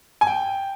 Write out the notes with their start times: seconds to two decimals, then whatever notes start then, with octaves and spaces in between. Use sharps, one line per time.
0.21 G#5
0.27 G5